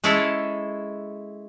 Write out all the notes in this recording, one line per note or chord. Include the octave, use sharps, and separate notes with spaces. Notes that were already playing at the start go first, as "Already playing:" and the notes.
G#3 C#4 E4 G#4 A4 C#5